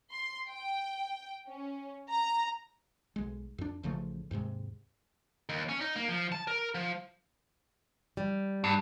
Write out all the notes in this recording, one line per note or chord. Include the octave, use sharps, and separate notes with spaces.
C6
G5
C#4
A#5
B1 G#3
F2 D4
A1 C#3 F3 A3
D#2 G#2 C3 G#3
D#2
C#4
D#4
A#3
F3
A5
A#4
F3
G3
G2